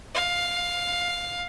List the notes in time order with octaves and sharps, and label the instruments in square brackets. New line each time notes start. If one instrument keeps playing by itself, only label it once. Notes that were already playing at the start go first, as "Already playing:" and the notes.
[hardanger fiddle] F5